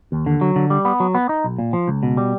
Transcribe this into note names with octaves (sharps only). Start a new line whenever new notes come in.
D#2
D3
F#3
D3
G3
B3
F#3
B3
D#4
B1
A#2
F3
C#2
B2
G3